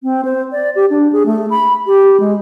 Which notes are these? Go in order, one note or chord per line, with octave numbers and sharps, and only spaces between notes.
C4
C5
D5
G4
D4
G#4
A3
B5
G4
G#3